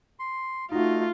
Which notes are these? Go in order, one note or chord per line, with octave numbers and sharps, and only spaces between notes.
C6
A3 D#4 F4 F#4 D#5